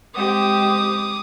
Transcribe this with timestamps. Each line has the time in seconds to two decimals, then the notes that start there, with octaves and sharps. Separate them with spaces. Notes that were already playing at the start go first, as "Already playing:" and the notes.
0.16 G#3 C4 G4 D6 D#6